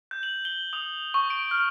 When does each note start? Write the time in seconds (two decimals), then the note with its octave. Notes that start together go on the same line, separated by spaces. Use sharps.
0.11 G6
0.23 F#7
0.45 G7
0.73 D#6
1.14 C#6
1.30 D7
1.51 F6